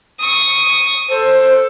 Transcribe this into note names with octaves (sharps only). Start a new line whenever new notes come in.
C#6 D#6
A4 C5